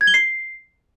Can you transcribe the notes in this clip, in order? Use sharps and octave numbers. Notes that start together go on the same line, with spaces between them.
G#6
G7
C7